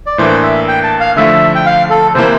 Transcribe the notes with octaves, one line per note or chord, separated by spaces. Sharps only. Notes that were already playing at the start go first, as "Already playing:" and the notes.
D5
A2 E3 A#3 D4 C5
E5
G5
A5
F5
D3 F3 A3 E4 E5
G5
F5
A4
C3 E3 A#3 E4 C5